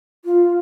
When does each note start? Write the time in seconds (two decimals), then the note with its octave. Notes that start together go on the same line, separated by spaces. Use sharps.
0.25 F4